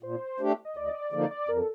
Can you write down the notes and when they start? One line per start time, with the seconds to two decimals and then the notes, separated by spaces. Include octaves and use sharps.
0.03 A#2 C5
0.40 A3 D4 G4
0.65 D#5
0.76 D2 D5
0.86 D#5
0.94 D5
1.12 D3 F3 A#3 D#4 D5
1.31 D5
1.48 F2 A#4
1.58 A4